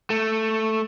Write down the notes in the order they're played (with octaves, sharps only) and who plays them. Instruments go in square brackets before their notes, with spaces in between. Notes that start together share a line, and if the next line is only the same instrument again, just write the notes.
[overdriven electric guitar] A3